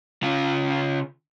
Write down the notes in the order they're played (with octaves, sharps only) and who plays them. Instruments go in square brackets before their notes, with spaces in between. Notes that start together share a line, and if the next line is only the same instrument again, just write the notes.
[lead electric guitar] C#3 F4